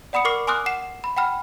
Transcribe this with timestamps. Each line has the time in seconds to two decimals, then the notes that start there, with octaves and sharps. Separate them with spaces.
0.13 D5 F#5 B5 D#6 C#7
0.25 A#4 C#6 D6 F6 C7
0.47 G#5 C6 D6 D#6 F6 F#6
0.66 F#5 C7 E7
1.04 B5
1.17 F#5 G5 B5 F6